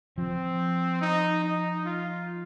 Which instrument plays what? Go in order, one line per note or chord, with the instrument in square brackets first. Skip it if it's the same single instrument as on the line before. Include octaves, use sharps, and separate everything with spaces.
[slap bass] F3 [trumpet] C4
[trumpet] D#4
D#4
F4